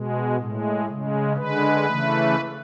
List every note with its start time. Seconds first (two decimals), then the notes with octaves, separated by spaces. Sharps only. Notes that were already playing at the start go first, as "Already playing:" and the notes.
Already playing: B2 G#3
0.37 A2 G#3
0.87 C#3 G#3
1.36 D3 G#3 B4
1.86 C#3 E3 A3